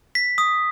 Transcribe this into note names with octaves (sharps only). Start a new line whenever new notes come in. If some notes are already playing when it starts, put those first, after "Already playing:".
B6
D#6